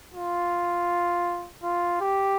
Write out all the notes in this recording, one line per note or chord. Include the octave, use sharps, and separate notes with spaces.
F4
F4
G4